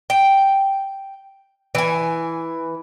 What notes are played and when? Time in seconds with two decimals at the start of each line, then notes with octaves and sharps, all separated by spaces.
0.10 G5
1.75 E3 G#5